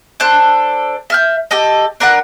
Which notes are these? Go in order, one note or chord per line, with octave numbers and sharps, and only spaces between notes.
D4 A4 C5 F#6
E5 F6 G6
G4 A4 D#5
D4 A#4 B4 F#5